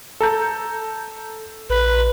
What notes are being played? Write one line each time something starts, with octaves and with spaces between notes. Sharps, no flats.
A4 A#5 G6
A#1 B4